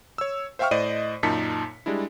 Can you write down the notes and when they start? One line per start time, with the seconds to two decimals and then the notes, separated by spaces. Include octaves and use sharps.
0.18 C#5 E6
0.59 C5 E5 F5 G5 C#6 F6
0.71 A2 C5 D5 D#5 D#7
1.23 F#2 A#2 D#4 A5 B6 C#7
1.86 G3 G#3 D4 E4